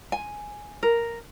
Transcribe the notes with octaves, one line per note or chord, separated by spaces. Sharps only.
G#5
A#4